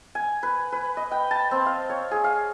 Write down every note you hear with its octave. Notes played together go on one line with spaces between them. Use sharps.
G#5
B4
B4
D#5
G5
A5
C4
F5
C#5
G#4
F5